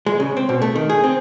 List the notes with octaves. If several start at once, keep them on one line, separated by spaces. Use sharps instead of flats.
G#3
C#3
C4
B2
A3
D#3
G#4
C4